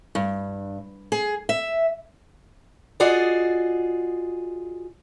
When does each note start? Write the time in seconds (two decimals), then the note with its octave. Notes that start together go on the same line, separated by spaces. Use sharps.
0.15 G2
1.12 G#4
1.49 E5
3.00 F4 F#4 G#4 D5 D#5